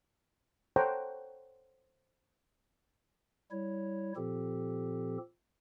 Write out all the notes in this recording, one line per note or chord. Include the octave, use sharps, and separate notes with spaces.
A4 C5 C#5 F#5 G5 A#5
G3 E4 C#5
A#2 F3 C4 G4 A4